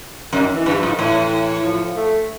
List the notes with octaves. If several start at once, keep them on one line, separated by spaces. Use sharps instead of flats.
F#2 D#3
E3
G2
F3
G#2
D#3
A2 E3
E3
F3
A3